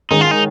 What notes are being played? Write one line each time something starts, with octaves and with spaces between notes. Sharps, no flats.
G#2 D#3 C#4 D#4 G#4
F4
D#4